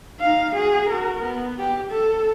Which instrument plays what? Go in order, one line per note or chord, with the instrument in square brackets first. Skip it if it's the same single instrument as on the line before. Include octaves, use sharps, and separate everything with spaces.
[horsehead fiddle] D#4 F5
F#4 G#4
F#4 A#4
B3
G4
A4